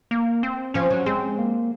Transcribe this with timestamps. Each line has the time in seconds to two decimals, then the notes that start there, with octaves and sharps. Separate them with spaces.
0.11 A#3
0.43 C4
0.74 F3 C#4
0.90 F#3
1.06 G#3 C4
1.38 A#3